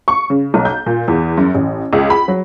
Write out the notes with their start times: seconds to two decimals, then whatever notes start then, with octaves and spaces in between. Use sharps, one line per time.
0.08 C#6
0.30 C#3
0.54 B1
0.65 G6
0.86 A#2
1.08 E2
1.37 F#2
1.54 A1
1.93 C#2
2.10 B5
2.28 F#3